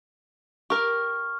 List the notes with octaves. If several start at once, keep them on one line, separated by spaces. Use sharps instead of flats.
G4 A#4 C#6 F6